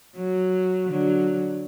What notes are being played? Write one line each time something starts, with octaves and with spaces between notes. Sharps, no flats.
F#3
D3 F#3